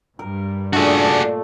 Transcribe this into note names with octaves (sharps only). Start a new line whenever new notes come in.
G2 G3 A#4
A#2 A3 D4 F#4 G#4 D#5